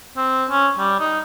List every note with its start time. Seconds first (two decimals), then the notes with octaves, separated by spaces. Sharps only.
0.17 C4
0.50 C#4
0.79 G3
0.99 D#4